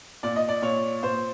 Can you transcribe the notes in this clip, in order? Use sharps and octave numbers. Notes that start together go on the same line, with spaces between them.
A#2 D5
D#5
D5
A#2 C#5
A#2 C5